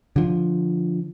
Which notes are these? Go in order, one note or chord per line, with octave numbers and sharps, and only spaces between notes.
D3 F3